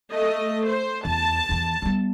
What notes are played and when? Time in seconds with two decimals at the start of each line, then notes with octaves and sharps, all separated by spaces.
0.11 A3 D#5
0.66 C5
1.05 E2 A5
1.49 E2 E3
1.82 G3 B3